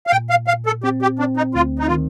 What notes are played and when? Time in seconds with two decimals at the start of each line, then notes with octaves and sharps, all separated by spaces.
0.07 F5
0.11 A#2 G5
0.30 F5
0.47 A#2 F5
0.66 A4
0.84 C4 G4
1.02 G4
1.19 C4 D4
1.37 D#4
1.55 D2 F4
1.79 D#4
1.87 F4
1.90 D#3